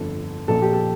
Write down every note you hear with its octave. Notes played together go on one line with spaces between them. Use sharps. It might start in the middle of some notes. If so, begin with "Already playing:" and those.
Already playing: G1 F2 D3 A4
A#1 A#2 A4
G4
A4